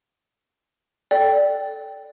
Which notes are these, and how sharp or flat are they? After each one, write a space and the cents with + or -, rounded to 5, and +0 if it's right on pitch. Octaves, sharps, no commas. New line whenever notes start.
A4 +0 D5 +0 G5 -5